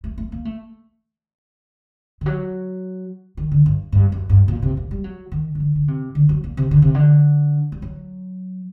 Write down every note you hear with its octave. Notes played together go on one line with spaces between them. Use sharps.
A3
A3
A#3
A3
D#3
F#3
D#3
D3
G2
G2
F#2
G2
A#2
C3
A#2
G3
F#3
D#3
D#3
D3
D3
C3
D3
F#3
A#2
C3
D3
C3
D3
G3
F#3